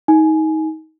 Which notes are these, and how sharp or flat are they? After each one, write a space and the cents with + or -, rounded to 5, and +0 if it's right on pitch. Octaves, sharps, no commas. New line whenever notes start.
D#4 +25 G#5 +20